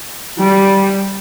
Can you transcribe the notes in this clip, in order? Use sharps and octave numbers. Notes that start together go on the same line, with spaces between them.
G3